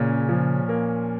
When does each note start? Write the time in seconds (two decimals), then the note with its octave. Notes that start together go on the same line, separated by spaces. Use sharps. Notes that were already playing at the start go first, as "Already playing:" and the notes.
Already playing: A#2 C#3 C#4
0.29 F3
0.69 A#3